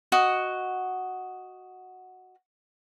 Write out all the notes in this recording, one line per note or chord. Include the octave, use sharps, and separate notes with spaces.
F#4 D#5 F#5